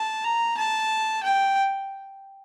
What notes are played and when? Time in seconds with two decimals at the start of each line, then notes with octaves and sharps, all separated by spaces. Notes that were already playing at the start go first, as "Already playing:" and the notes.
Already playing: A5
0.24 A#5
0.57 A5
1.23 G5